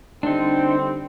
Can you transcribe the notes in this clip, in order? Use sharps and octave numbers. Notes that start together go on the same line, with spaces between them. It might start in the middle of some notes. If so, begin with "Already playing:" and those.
D3 G3 C4 D4 D#4